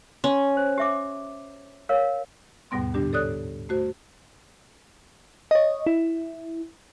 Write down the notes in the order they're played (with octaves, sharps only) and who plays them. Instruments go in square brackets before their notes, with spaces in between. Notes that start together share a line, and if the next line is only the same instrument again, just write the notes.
[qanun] C#4 [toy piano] C6
[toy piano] C5
G4 E5 D6
A#4 C#5 F5
[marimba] D#2 G#2 B2 G3 B3 C6
A2 D3 G3 D4 G4
A4 C#5 D5 D#6 F#6
A3 F#4 C5
[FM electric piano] C#5 D#5
E4